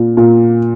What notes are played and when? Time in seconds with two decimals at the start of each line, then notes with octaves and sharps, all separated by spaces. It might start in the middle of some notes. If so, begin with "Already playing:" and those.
Already playing: A#2
0.17 A#2